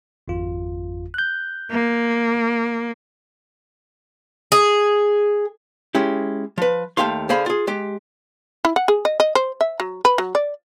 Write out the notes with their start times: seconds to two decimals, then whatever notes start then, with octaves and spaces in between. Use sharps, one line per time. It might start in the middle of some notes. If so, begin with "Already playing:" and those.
0.28 G#1 F2 F4
1.14 F#6 G6
1.71 A#3
4.52 G#4
5.95 G#3 C#4 E4 G4
6.58 F3 B4
6.97 D#2 B2 A3 G4 F5 C6
7.29 D3 G#4 C5 F5 B5
7.46 F4 G#4
7.67 G#3 G4
8.65 E4
8.76 F#5
8.88 G#4
9.05 D#5
9.20 D#5
9.35 C5
9.61 E5
9.80 F#3
10.05 B4
10.18 F#3
10.35 D5